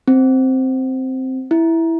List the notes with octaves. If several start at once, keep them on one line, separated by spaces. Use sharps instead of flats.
C4
E4